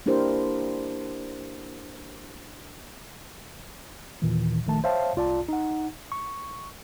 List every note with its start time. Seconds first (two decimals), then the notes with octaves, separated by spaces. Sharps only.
0.06 A#3 D4 E4 G4 A#4 C5
4.22 D#2 A#2 D#3 E3
4.67 A#1 D#3 A3 A5
4.84 C5 C#5 E5 F5 G5 A5
5.16 C2 F4 D5 A5
5.49 D#4 F#5
6.12 C#6